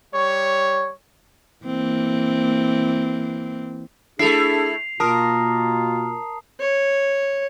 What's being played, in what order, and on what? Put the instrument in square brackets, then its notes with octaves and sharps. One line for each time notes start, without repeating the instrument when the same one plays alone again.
[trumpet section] G3 C#5
[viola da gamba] E3 A#3 C4
[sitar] A3 E4 [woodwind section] D4 G#4 A4 [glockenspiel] C7 F7
[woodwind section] B2 A#3 F4 [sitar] A#4 [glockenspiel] A5 A#5 D#6
[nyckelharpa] C#5